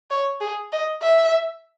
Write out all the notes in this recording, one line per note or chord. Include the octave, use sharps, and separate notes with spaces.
C#5
G#4
D#5
E5